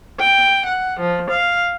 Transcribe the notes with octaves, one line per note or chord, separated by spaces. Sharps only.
G5
F#5
F3
F5